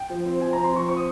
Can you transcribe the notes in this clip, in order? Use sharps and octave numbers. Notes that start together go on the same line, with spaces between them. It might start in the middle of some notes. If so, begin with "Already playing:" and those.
Already playing: G5
F3
C4
F3 G#5
C4 A#5
C6
F3 C#6
C4 C#6
D#6